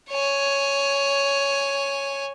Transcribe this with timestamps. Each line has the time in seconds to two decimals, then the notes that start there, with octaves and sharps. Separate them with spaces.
0.10 C#5 G#5